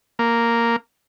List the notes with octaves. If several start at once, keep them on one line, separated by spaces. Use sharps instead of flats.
A#3